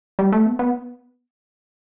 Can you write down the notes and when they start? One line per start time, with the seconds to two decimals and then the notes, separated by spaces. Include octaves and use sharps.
0.19 G3
0.32 A3
0.46 B3
0.59 B3